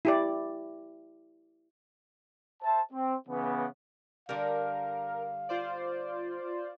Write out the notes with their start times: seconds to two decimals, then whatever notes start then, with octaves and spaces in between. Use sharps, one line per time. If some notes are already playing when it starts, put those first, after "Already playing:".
0.05 E4 G4 D5
2.62 C5 E5 A5
2.92 C4
3.28 C#3 E3 B3
4.29 D3 G3 A#4 F5
5.49 F4 C5 D5